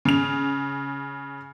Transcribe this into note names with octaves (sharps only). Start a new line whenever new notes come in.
C#3 F7